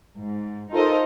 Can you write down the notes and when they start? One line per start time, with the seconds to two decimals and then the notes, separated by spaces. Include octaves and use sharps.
0.19 G#2
0.72 D#4 F4 A4 A#4 C5 D#5